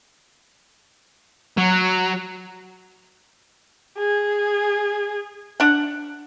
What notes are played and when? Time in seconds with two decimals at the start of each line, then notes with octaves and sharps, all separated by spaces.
1.57 F#3
3.98 G#4
5.60 D4 F#5